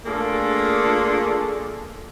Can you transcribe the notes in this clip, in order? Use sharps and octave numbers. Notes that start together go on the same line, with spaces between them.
A3 A#3 D4 F4 G#4 A4